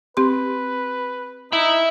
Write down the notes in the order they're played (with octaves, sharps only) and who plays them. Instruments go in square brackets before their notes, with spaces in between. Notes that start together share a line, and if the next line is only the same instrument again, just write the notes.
[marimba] C4 G4 C6 [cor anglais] B4
[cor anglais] D#4 [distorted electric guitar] E5 B5